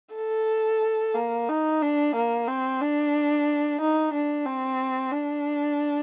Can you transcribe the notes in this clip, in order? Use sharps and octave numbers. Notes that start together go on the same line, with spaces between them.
A4
A#3
D#4
D4
A#3
C4
D4
D#4
D4
C4
D4